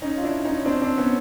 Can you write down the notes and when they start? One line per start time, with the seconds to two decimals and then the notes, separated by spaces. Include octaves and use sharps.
0.02 C#4 D#4
0.17 F4
0.23 D4 E4
0.45 C#4 D#4
0.66 C4 D4
0.82 C4 D4
0.98 B3 C#4